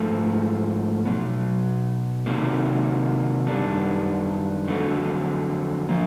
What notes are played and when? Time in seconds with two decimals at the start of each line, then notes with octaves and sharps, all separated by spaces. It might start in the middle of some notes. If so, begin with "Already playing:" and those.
Already playing: G#2 F3 A3
1.05 B2 F#3 B3
2.26 C3 D#3 F#3 A#3
3.46 F#2 D#3 G3 B3 D4
4.67 F2 D3 F#3
5.89 F3 A#3